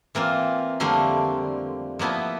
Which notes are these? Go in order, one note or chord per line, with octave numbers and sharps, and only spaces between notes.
E3 A#3 C4 F4
F2 D3 G3 A3 A#3 C6
F3 A#3 B3 E4 D#5